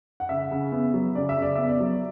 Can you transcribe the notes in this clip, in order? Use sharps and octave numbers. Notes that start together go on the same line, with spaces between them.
F#5
C#3 E5
C#3
B3
F#3
C#3 D5
E5
C#3
D5
B3 E5
D5
F#3